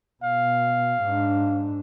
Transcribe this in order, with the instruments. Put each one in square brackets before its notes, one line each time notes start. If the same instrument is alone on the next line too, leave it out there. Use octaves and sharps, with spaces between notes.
[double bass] B2 [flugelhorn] F5
[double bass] G#2 D4